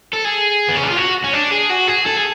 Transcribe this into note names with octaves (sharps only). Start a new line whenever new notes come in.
A4
G#4
B3
C#4
D4
F4
F#4
C#4
D4
G#4
F#4
G#4
A4
G#4